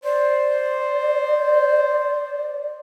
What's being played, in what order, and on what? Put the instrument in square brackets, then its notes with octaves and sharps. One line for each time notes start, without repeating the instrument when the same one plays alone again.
[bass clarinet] C5 [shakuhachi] D5